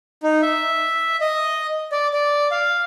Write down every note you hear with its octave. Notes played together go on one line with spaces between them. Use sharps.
D#4
E5
D#5
D5
D5
F5